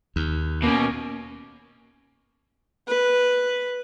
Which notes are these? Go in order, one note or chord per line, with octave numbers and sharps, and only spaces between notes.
D#2
B2 A#3 C#4
B4